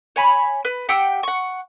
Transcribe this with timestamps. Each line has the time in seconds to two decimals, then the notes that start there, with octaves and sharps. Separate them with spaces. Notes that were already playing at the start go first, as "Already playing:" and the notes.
0.16 C#5 G#5 B5
0.65 B4
0.89 G4 F#5 G5 E6
1.23 F#5 C#6